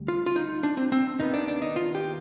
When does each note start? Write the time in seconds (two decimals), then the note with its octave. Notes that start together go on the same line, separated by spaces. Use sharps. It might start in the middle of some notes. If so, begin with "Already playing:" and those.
Already playing: D2 G3
0.08 F4
0.26 F4
0.36 D#4
0.63 D4
0.77 C4
0.92 C4
1.19 D#2 D#3 B3 D#4
1.34 D4
1.48 D4
1.62 D#4
1.76 F4
1.95 G4